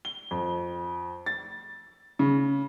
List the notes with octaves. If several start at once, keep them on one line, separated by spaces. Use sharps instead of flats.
G7
F2
A6
C#3